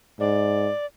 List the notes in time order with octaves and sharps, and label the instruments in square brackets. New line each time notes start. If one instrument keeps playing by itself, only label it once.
[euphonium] G#2 [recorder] D5